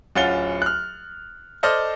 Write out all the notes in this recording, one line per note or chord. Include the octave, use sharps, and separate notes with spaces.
D1 C#4 F4 F#5 A6 G7
F6 F#6
A4 C5 D5 D#5 A5 F6